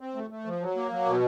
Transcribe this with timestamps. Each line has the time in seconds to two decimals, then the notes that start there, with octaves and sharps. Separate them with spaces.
0.01 C4
0.15 A3
0.30 A3
0.45 F3
0.60 F#3
0.76 A#3
0.91 F#3
1.06 B2